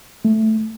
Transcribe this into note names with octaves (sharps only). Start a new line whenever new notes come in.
A3